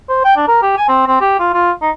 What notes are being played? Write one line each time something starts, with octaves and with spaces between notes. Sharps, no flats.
C5
G5
D4
A#4
G4
G#5
C4
C4
G4
F4
F4
D#4